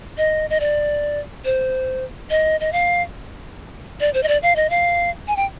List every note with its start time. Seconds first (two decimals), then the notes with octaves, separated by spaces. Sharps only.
0.18 D#5
0.50 D#5
0.60 D5
1.45 C5
2.30 D#5
2.60 D#5
2.72 F5
4.00 D5
4.14 C5
4.23 D#5
4.28 D5
4.43 F5
4.56 D#5
4.70 F5
5.28 G#5
5.36 G5